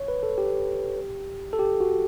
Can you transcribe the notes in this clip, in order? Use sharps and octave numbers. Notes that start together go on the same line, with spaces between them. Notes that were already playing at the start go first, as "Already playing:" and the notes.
Already playing: C#5
B4
A4
G4
A4
G4
F#4